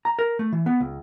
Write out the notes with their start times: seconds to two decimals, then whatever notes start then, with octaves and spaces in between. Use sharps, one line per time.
0.05 A#5
0.19 A#4
0.39 A3
0.52 E3
0.66 B3
0.80 C#2